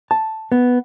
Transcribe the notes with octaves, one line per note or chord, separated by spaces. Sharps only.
A5
B3